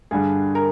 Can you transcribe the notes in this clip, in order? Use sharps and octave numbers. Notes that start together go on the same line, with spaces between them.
G2 D3 G3 G#4
A#4